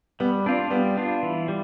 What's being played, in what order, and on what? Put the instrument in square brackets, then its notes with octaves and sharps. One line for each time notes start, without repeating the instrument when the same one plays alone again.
[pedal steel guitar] G3 [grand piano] B3
[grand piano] C4 [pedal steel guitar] D4 F4
[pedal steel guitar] G3 [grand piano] B3
[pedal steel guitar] D4 F4
E3
G3